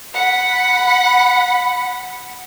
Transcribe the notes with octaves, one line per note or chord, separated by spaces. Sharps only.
F#5 B5